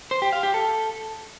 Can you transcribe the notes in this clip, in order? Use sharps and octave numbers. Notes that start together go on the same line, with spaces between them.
C5
G4
F5
G4
A4